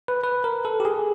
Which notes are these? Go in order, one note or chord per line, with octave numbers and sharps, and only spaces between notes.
B4
B4
A#4
A4
G4
G#4